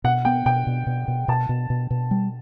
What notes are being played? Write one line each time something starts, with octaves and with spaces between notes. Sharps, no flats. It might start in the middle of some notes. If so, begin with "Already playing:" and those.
B2 F#5
B3 G5
B2 G5
B2
B2
B2
B2 A5
B2
B2
B2
G3